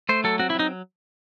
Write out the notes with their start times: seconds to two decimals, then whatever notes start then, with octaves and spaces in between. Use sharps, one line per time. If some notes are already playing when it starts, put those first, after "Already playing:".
0.09 A3 C5
0.24 F#3 A4
0.39 C4 F#4
0.50 E4
0.55 F#3 D#4